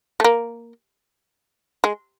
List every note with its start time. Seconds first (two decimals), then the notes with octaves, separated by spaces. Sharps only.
0.20 A3
0.24 A#3
1.84 G#3